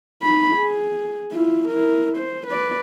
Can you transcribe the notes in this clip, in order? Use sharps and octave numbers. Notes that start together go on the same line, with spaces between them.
D#4 B5
G#4
E4 F4
E4 A#4
C5
B4 D5